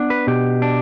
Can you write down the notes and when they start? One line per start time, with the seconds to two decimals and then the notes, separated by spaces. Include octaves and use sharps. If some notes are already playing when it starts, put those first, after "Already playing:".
Already playing: B3 D4
0.10 B4
0.27 B2 G4
0.62 D4